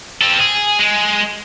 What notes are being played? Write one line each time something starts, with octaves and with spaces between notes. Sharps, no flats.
C4 A4
G#4
G#3